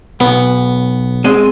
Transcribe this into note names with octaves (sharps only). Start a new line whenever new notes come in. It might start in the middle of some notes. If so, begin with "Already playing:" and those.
B1 B3
G#3 C4 D#5